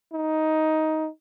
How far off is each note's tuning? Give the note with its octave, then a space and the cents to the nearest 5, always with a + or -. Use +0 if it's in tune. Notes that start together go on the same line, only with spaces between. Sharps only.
D#4 +10